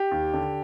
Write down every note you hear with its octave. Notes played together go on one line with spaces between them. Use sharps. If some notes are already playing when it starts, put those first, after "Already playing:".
Already playing: G4
D#2
D3